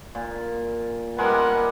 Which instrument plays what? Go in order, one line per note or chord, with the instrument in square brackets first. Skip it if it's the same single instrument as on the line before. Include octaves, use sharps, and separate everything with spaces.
[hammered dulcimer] A#2
[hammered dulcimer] G3 G#3 [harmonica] A#4 B4 F#5